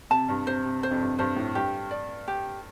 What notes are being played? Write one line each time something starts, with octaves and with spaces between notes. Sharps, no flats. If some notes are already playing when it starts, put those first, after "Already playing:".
C3 A5
G2
C3 C5
C3
C5
F2
G2
G2 C5
A2
G2 G4
D5
G4